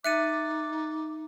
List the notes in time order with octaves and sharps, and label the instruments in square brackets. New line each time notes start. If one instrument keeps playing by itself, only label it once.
[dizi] D#4 [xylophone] E5 C#7 D#7 [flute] D6 [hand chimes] F#6 A6